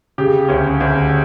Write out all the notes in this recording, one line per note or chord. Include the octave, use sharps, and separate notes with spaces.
C#3 G4
D2 C#4
D2